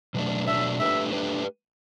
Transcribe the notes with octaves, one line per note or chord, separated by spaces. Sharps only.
B2 F#3 A3 D4
B2 F#3 A3 D4 E5
A3 D4 G4 B4 E5
A3 D4 G4 B4